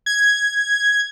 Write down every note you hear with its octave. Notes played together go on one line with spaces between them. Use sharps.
G#6